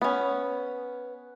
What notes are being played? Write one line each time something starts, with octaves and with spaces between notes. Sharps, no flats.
B3 C#4